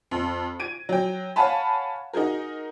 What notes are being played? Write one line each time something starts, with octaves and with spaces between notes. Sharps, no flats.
F2
G#6 D7 D#7
F#3 G5
C#5 F5 F#5 G#5 A5 B5
D#4 F#4 G#4 A#4